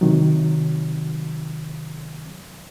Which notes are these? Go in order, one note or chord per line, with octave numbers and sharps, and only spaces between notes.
C3 D#3 F#3